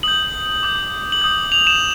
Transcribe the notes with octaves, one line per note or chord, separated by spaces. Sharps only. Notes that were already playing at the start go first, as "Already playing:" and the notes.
D#6 G6 F#7
D6 G6
F#7
D#6 G6
F7
E7